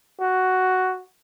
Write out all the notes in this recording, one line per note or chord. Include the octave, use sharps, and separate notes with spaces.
F#4